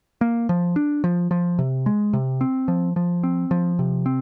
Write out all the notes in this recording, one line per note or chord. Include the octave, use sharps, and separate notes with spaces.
A#3
F3
D4
F3
F3
C3
G#3
C3
C4
F3
F3
C4
F3
C3
C4